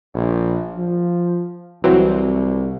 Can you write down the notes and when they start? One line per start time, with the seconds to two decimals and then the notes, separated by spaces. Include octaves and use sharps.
0.15 A#1
0.76 F3
1.84 C2 E3 F#3 C4